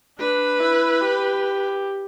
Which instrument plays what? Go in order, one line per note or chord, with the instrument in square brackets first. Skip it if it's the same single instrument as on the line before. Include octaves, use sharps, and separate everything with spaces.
[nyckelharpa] D4 [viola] B4
[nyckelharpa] E4
G4